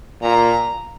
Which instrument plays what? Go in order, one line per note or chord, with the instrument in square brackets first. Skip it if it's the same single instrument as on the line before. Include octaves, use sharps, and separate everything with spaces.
[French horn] A#2 [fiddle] A#5